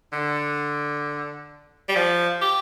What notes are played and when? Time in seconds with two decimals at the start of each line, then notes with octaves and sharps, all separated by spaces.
0.13 D3
1.88 G3
1.95 F3
2.41 G4